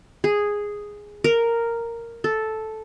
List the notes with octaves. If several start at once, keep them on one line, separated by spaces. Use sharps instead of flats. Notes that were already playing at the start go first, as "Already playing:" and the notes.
G#4
A#4
A4